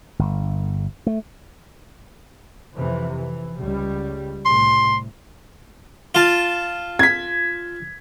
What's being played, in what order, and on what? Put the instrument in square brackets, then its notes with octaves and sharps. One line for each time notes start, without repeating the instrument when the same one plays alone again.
[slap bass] G1
A3
[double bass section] F2 C3 E3
E3
C#2 G3
[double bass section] C2 A2 [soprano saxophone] C6
[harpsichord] F4 A5
[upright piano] G#6 B6